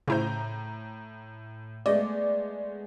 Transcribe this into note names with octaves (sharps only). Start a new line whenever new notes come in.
A2 C#3 E4 C5 A#5 G6
G#3 A3 B3 D5 D#5